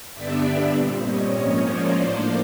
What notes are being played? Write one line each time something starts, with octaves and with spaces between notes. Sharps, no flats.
G2 D3 G3 B3 D4 D5 E5
A#2 G3 C4
C#5 D#5
G#2 F3 A#3 C#4 C#5 D#5
C5 D5
A2 F3 A#3 D4